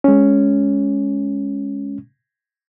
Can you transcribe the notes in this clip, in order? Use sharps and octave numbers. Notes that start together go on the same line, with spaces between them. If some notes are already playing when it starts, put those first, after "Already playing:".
G#3 C#4